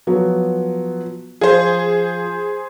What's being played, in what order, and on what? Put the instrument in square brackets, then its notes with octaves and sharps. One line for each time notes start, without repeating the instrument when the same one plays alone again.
[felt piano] F3 F#3 B3
[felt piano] F3 F5 [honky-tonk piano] G#4 C5